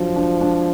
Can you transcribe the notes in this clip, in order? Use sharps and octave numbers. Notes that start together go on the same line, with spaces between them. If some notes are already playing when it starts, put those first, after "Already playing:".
Already playing: F3 F#3 D4
D4
D4